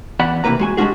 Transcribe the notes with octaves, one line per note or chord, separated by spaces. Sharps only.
E2 D5 F#5 B5
C3 E3 A#3 B4 A#5
G#3 F#4 G#5
G3 G#3 D4 F4 F#4 G#4